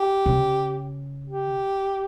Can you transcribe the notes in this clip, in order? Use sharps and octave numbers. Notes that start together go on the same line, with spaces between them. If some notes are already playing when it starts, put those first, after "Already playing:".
Already playing: G4
C#3
G4